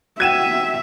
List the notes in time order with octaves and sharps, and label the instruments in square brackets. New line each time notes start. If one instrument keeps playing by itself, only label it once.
[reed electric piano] F#4 F#5 G5 [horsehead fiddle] E5 [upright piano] G#6 D#7 E7